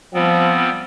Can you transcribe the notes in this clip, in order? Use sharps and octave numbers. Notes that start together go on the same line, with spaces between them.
F3 G3 B3 C4